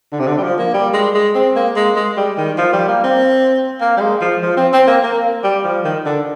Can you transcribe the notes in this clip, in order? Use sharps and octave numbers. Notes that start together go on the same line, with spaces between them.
D3
C3
D3
G3
F3
A#3
G3
G#3
G#3
C4
A#3
G#3
G#3
G3
D#3
F3
G3
A#3
C4
A#3
G3
G#3
F3
F3
C4
C4
A#3
A#3
G3
F3
D#3
D3